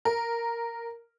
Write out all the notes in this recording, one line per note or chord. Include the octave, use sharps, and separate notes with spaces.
A#4